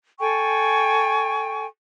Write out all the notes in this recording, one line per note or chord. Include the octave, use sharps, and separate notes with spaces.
A4 G5 G#5 C#6